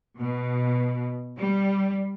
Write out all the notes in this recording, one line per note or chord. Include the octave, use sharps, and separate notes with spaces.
B2
G3